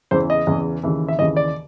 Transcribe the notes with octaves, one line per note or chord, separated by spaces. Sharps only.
E2 C#3 E3 C5
D#5
E2 C#3 E3
D#2 C#3 E3
E5
D#2 C#3 E3 D#5
D5